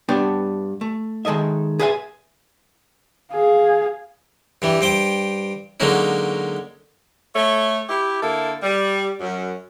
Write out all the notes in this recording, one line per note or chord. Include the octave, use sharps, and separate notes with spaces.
G2 B3 D4 C#5 G5
A3
D#3 G#3 A4 D#5 E5
G#4 B4 C5 E5 F5 G#5
G#4 F5
G2 E3 G3
G2 C5 G5
D3 F#3 G#3 A#3 C#4 D#4
A3 C#5
E4 G4
D3 A#3 E4 A4
G3
F#2